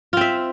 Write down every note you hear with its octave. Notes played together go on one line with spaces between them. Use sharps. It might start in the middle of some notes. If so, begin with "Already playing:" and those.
C4 F4 E5